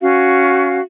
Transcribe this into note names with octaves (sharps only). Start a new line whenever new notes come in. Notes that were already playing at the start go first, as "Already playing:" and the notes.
C#4 F#4 F5